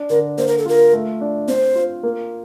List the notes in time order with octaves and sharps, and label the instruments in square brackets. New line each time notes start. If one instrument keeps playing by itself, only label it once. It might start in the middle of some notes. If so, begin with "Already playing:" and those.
Already playing: [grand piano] D4
[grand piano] D3 [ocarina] A#4
[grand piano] A#3 [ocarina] C5
[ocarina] A#4
A4
[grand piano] F4 [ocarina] A#4
[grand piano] A3
D4
[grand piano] C4 [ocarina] C5
[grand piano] F4
A#3